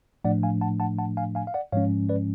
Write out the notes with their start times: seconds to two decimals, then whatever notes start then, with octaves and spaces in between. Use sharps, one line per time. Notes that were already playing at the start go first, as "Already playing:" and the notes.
0.24 A2 F3 A3 D4 D5 F#5
0.43 F5 G#5
0.61 F#5 A5
0.80 F#5 A5
0.98 F#5 A5
1.17 F5 G#5
1.35 F5 G#5
1.47 F5
1.54 D5 F#5
1.72 G#2 F3 G#3 C#4 C#5 F5
2.09 B4 D5